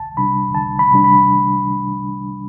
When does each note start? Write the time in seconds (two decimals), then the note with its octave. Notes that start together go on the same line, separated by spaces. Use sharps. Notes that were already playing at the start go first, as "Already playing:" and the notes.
Already playing: C2 A5
0.17 C3 G3 D4 B5
0.55 C2 A5
0.79 B5
0.92 C3 G3 D4
1.04 B5